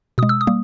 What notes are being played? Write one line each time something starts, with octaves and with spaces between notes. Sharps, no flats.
B2 G#3 D#6
E6
D#6
G3 A#3